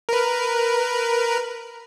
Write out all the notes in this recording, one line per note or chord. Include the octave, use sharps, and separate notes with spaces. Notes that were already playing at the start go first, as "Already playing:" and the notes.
A#4 B4